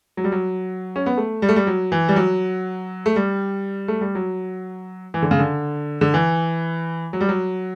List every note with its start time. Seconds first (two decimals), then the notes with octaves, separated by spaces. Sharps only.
0.17 F#3
0.24 G3
0.32 F#3
0.96 C#4
1.06 B3
1.17 A3
1.42 G3
1.49 A3
1.56 G3
1.67 F#3
1.92 E3
2.09 G3
2.16 F#3
3.06 A3
3.16 G3
3.88 A3
4.01 G3
4.15 F#3
5.14 E3
5.22 D3
5.31 C#3
5.39 D3
6.01 D3
6.14 E3
7.13 F#3
7.21 G3
7.29 F#3